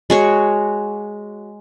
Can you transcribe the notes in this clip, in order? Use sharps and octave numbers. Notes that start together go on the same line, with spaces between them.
G#3 F#4 C#5